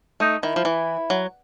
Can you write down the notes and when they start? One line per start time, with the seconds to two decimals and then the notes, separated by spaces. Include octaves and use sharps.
0.20 A3 D#4
0.43 D#3 E4
0.56 F3
0.65 E3
1.10 F#3